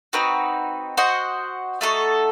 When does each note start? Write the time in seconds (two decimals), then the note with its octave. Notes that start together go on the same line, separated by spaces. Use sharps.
0.13 C4 D#4 F#4 B4
0.97 F#4 C5 D#5 F#5
1.81 A3 D#4 F#4 A4